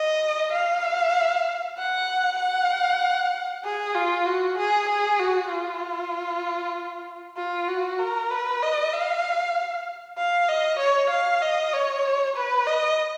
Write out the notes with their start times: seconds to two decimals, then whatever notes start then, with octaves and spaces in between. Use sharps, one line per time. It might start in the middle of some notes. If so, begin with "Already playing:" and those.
Already playing: D#5
0.53 F5
1.78 F#5
2.39 F#5
3.64 G#4
3.95 F4
4.26 F#4
4.58 G#4
4.89 G#4
5.19 F#4
5.51 F4
7.37 F4
7.69 F#4
8.00 A#4
8.31 B4
8.62 D#5
8.93 F5
10.18 F5
10.49 D#5
10.80 C#5
11.11 F5
11.42 D#5
11.73 C#5
12.36 B4
12.67 D#5